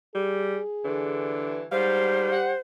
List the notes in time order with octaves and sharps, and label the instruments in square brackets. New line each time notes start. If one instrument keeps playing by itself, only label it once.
[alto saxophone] G3 [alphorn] G#4
[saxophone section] G2 E3 [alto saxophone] D3
[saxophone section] G#2 F#3 F5 [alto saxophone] G3 [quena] C5
[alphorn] G4 [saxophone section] F#5